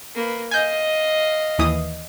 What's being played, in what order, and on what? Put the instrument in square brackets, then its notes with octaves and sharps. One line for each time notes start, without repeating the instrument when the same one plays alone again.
[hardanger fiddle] A#3 B4
[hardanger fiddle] D#5 F5 [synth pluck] G#5 G6
[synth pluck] D#2 E3 D#6